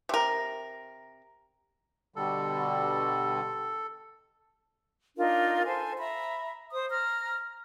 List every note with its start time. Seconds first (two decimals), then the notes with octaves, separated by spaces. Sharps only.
0.09 C3 A#4
2.16 B2 D3 G3 A4
5.16 D4 D#4 F4 A#4
5.64 A4 C5 G#5
5.98 E5 A#5 B5
6.71 C5 D#6
6.90 A#5 F6